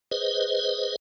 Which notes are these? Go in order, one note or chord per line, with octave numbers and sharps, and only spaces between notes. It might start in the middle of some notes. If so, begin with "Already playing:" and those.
G#4 B4 C5 D#5